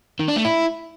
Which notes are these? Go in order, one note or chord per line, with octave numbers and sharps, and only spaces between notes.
D#3
D4
A3
E4